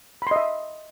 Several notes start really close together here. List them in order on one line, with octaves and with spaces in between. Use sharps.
B5 C6 D#5 E5